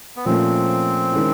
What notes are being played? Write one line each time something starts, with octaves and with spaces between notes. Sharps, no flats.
B3
A#2 F3 A3 C4 C#4 F4
D#3 G#3 C#4 E4